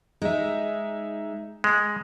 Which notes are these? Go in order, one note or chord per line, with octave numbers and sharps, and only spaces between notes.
G#3 D#4 E5
G#3